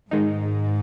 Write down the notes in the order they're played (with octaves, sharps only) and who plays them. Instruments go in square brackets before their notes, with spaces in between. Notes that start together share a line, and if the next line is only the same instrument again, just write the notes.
[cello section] G#2 [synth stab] D#3 G#3 D#4